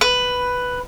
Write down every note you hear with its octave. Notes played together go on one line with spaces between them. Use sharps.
B4